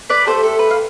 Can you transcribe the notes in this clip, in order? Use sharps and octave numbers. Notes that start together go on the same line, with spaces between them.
B4 D5
A3 D4 G4 A4 C5
A4
B4
F5